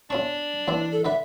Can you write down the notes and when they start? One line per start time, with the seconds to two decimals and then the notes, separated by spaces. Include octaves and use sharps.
0.10 E2 C#4 D4 C#6
0.68 D#2 E3 C4 D5
0.92 A4
1.05 D3 D4 B4 E5